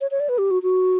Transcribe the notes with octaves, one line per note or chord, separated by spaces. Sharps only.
C#5
C#5
D5
B4
G4
F#4
F#4